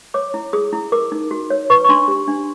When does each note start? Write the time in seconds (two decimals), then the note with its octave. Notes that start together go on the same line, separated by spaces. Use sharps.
0.14 C#5 D6
0.34 E4
0.53 G#4 D#6
0.73 E4
0.92 A#4 D6
1.12 D#4
1.31 F#4
1.50 C#5
1.70 B4 C#6
1.84 C#6
1.89 D4 C6
2.08 G4
2.28 D4